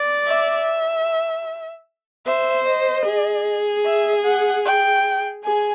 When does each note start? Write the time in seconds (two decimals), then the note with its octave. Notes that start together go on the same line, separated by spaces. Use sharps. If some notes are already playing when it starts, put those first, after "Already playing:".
Already playing: D5
0.27 E5
2.25 C5 E5
2.66 D#5
3.06 G#4
3.85 E5
4.25 F#5
4.65 G5
5.44 G#4 G#5